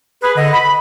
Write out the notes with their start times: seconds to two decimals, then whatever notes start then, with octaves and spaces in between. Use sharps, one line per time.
0.22 G#4 B4
0.37 D3 D#5
0.53 B5